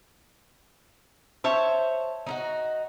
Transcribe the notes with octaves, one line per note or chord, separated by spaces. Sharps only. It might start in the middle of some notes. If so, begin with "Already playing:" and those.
C5 C#5 E5 A5
D#4 E4 F#4